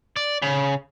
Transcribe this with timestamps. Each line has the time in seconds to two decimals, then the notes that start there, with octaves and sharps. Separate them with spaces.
0.16 D5
0.42 C#3